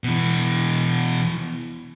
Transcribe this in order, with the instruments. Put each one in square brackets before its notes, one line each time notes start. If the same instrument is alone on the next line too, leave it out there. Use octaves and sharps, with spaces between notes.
[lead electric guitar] B2 E3